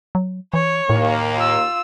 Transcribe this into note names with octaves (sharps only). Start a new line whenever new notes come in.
F#3
E3 C#5
D#2 A2 A#3
F4 E6